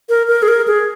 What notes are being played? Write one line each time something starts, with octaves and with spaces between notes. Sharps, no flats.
A#4
A#4
G#4
A#4
G#4